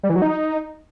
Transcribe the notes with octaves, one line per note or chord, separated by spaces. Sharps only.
G3
E3
F#3
D#4